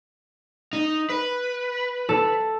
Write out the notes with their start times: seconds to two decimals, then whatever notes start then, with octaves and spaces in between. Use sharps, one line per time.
0.73 D#4
1.10 B4
2.09 A4